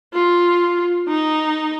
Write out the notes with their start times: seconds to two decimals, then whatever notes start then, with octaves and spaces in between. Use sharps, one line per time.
0.14 F4
1.08 D#4